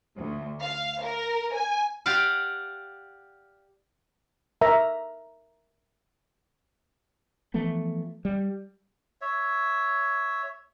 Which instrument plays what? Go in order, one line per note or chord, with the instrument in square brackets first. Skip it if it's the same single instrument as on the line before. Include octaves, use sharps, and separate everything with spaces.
[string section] D2
F5
A#4
G#5
[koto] G4 D5 F5 F#5
[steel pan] A#4 E5 A#5
[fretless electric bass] E3 F3 A3 B3
G3
[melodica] C#5 E5